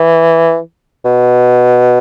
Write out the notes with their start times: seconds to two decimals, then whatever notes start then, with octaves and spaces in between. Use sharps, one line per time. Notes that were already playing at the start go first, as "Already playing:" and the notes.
Already playing: E3
1.04 B2